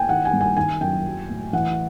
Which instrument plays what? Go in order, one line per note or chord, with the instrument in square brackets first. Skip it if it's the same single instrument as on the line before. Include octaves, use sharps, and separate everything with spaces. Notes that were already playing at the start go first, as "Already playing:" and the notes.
Already playing: [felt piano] G5 G#5
[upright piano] D#3 [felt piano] F#5
[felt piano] G#5
[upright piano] G2
[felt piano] G#5
[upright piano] D#3 [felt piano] G#5
[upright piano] F#2 [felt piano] G5
[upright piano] F#3
A2
[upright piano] E3 [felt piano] F#5